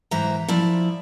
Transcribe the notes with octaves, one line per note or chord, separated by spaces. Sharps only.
G#2 E3 C5 E5 A#5
F3 E4 D5